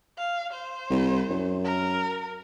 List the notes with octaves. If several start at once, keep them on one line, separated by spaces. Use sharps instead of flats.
F5
C5
C2
F#2
A#4